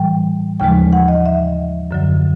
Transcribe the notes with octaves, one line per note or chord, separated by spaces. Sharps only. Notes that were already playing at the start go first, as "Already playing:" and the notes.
Already playing: A2 E3 G3 G5
D#2 C#3 F3 G#3 G5
F#5
D#5
E5
F#2 D3 F#3